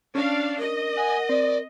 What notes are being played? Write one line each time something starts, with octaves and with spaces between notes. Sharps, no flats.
C#4 D4 F5
A#4 D#5
F#5 G#5
C4 D5